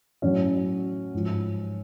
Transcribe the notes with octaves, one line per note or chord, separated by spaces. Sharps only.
A2 F#3 C#4
G#2 F3